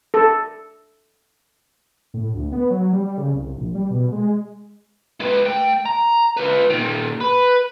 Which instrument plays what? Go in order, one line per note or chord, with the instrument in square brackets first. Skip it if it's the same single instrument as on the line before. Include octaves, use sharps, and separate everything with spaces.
[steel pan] A4
[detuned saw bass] A2
D2
B3
F#3
G3
C#3
C2
A#1
G3
B2
G#3
[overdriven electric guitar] G#3 B4
A3 G5
A#5
F4 B4
A#2 D#3
B4